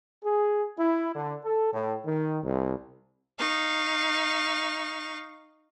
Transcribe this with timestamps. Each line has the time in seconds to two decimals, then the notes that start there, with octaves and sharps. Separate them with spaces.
0.23 G#4
0.78 E4
1.15 D3
1.43 A4
1.73 A2
2.05 D#3
2.43 C2
3.37 D#4 F5 C#6